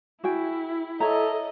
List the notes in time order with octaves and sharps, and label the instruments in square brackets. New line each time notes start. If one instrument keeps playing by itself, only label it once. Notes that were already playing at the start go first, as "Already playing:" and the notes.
[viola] E4 [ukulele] F#4 G#4 G5
[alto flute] A4 [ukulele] C#5 E5 A#5 [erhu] D#5